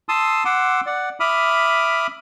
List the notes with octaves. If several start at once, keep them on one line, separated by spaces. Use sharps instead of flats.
A5 C6 D#6 E6
F#5 C6 D6 E6
D5 F#5
E5 B5 D6 D#6 F6